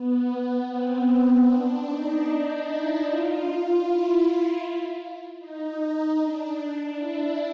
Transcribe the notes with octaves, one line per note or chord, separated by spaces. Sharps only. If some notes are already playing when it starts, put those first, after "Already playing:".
Already playing: B3
C4
D4
D#4
D#4
E4
F4
E4
D#4
D#4
D4
E4